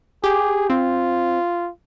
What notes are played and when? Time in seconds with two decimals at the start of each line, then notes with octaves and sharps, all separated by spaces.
0.24 G4 G#4
0.70 C4 F4